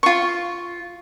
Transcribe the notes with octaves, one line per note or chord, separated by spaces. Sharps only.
F4 C#6